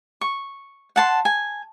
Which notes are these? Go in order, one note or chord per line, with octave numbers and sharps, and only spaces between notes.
C#6
F#5 A5 C6
G#5